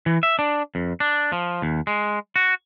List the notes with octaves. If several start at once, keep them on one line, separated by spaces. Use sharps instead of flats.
E3
E5
D4
F2
D4
F3
D#2
G#3
F#4